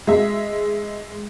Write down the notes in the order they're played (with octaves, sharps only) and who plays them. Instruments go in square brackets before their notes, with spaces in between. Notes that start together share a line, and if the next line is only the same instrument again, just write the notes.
[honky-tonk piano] G#3 E5